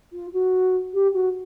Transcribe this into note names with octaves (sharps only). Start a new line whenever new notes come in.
F4
F#4
G4
F#4